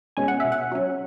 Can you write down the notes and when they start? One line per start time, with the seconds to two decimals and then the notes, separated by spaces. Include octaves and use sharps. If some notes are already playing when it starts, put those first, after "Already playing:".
0.17 B2 G#3 C#4 G#5
0.28 F#5
0.40 B2 E5
0.52 F#5
0.72 F#3 C#4